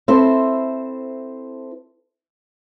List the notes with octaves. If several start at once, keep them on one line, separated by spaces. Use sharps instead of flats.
C4 E4 A4 C5